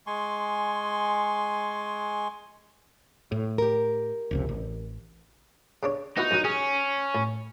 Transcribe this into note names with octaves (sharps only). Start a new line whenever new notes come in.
G#3 G#5 C6 C#6
A2
G4 A#4
F1 C#2 C3
A1
C#3 D4 C#5
B3 D#4 E4 F#4
F#2 F#3
C#4 G#4
A2